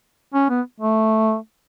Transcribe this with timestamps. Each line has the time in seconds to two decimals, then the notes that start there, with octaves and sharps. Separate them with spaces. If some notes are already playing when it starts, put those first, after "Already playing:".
0.34 C#4
0.50 B3
0.80 A3